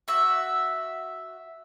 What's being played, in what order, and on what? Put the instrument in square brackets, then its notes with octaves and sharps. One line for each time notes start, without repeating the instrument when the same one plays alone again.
[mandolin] F#4 E5